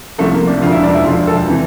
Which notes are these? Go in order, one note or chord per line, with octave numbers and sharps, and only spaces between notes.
C2 C3 F3 A3
A#3
D4
E1 D2 D3 F3 F4
E4
D4
E4
E1 D2 D3 F3 F4
A4
C3 E3